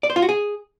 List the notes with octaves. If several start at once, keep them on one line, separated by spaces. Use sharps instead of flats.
D5
C5
F4
F#4
G#4